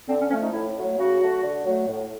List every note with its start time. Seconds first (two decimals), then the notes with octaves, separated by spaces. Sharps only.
0.08 D3 C4
0.19 C#4
0.30 F3 C#4
0.34 A3
0.41 D#4
0.52 A2 E4
0.75 F#3 A3
0.97 C#3 F#4
1.21 F#3 A3
1.42 D3
1.65 F#3 A3
1.87 A2